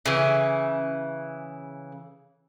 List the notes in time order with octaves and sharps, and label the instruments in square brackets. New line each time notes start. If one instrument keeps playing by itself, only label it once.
[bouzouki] C#3 E3